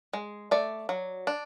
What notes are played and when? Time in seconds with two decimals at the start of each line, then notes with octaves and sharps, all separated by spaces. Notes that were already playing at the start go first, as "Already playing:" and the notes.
0.13 G#3
0.51 A3 D5
0.89 F#3
1.27 D4